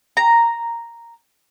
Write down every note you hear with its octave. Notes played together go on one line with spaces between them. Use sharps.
A#5